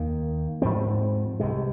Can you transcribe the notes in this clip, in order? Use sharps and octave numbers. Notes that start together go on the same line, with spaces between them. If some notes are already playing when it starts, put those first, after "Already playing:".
Already playing: D#2 D#3 A#3
G#2 F3 C4
C2 C3 G#3